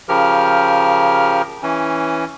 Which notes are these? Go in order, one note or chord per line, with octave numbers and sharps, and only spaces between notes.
C#3 F3 G4 A#4 F6
E3 C#4